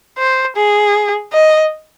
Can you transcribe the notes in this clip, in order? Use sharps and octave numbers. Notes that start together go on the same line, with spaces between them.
C5
G#4
D#5